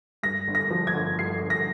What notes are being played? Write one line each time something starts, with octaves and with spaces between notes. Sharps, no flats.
G2 A#6
G1
A#6
F3
G#6
G1
G2 C7
G1
A#6